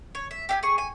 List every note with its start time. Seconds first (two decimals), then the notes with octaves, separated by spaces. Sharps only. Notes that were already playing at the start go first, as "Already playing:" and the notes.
0.15 C#5
0.31 E5
0.49 G4 E5 G#5
0.63 G#4 C#6
0.78 G#5